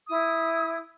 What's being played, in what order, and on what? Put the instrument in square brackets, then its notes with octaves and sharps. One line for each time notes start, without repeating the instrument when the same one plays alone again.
[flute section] E4 D#6